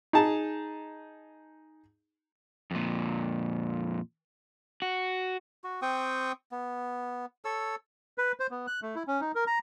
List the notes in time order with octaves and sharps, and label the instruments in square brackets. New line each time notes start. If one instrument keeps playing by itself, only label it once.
[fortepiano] D#4 G#4 A5
[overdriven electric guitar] F2 A#2
F#4
[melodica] F#4
C4 G5 C#6 D#6
B3
A4 C#5 E6
[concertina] B4
C5
B3
F#6
A3
E4
C#4
D#4
A#4
A#5